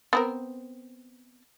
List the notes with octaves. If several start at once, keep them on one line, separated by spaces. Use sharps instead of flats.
B3 C4 A#4